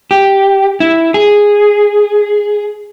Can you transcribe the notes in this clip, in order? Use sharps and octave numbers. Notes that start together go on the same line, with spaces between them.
G4
E4
G#4